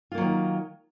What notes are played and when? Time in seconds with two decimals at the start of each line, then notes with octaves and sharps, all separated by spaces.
0.12 F4
0.15 A#3
0.18 F#3
0.21 D#3